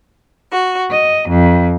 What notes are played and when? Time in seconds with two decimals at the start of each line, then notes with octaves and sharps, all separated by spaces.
0.51 F#4
0.90 D#5
1.29 F2